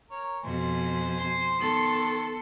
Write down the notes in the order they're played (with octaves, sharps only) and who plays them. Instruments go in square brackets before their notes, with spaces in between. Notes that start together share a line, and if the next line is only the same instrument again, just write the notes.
[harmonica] A#4 C#5
[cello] F2 B2 [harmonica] C5 G#5
[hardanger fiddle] C6
[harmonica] D#3 [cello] B3 A4